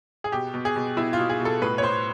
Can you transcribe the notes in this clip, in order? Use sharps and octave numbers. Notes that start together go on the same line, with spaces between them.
G#4
B2 G4
B2
G#4
B2
B2 E4
F4
B2
G#4
B2
A4
A2 B4
C#5
A2 C5